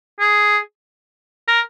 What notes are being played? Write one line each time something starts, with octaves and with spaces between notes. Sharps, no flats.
G#4
A#4